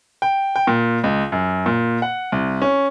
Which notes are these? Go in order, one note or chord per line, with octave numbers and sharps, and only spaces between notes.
G5
G5
A#2
C#2
F#2
A#2
F#5
C2
C#4